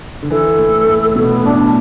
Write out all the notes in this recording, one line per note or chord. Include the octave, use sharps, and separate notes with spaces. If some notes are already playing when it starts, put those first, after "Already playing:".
D3
E3 A4
A2
A2
B2 B3
A2 D4